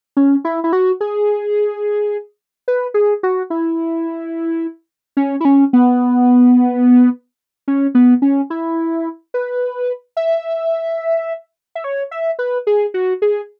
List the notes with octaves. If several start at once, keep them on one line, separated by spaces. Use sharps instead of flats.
C#4
E4
E4
F#4
G#4
B4
G#4
F#4
E4
C#4
E4
C#4
B3
C#4
B3
C#4
E4
B4
E5
E5
C#5
E5
B4
G#4
F#4
G#4